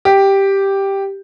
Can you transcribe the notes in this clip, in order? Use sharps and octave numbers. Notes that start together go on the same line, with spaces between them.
G4